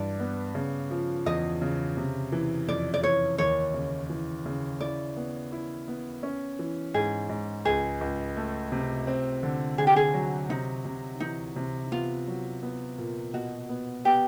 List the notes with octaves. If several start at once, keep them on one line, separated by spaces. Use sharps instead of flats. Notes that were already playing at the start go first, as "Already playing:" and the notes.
Already playing: G2 E3 D5
B3
C#3
F3
E2 D#5
C#3
C3
E3
F2 D5
D5
E3 C#5
D#2 C#5
C#3
E3
C#3
E4 D5
B3
E4
B3
C#4
E3
G#2 G#4
G#2
C#2 G#4
C#2
A3
C3
C4
D3
D3 G#4
G4
G#4
F#3
C3 D#4
C3
E3 D#4
C3
B3 F4
F#3
B3
A#2
B2 F#4
B3
B3 G4